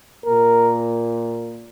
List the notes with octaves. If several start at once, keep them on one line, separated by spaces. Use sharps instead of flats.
A#2 A#3 A#4